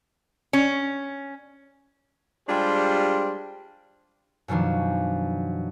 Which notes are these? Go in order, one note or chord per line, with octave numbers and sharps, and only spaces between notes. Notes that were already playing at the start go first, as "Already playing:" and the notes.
C#4
G3 G#3 D4 F4 G4 C5
F#2 B2 D#3 F3 D4